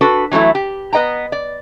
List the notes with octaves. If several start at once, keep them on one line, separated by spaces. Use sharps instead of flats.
D4 F#4 A4 B4
E3 F#3 G3 A3 E4
G4
B3 B4 D#5 G5 A#5
D5